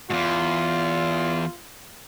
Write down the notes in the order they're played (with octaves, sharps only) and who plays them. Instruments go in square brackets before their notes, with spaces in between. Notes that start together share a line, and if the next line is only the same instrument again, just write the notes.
[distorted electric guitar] E2 G#2 [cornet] F4